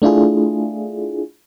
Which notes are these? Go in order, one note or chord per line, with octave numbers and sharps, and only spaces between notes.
A3 D4 E4 F4 G#4